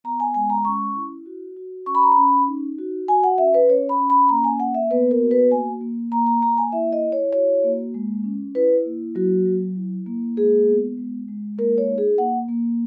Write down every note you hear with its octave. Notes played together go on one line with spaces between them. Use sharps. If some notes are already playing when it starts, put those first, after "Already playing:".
B3 A#5
G#5
G#3 G#5
A#5
C#4 C#6
E4
F#4
F#4
C#4 C#6
B5
A#5
B5
C#4
D#4
F#4
F#4 G#5
F#5
C#4 E5
B4
C#4 C#5
B5
C#4
B5
A#3 A#5
G#5
A#3 F#5
E5
B3 B4
A#4
F#4
B4
A#3 G#5
A#3
A#3 A#5
A#5
A#3 A#5
G#5
E4 E5
D#5
E4
C#5
F#4 C#5
A#3
G#3
C#4
E4 B4
A#3
F#3 F#4
F#3
E4
A#3
G#3 G#4
B3
G#3
G#3
A#3 A#4
C#5
D#4
G#4
A#3 F#5
A#3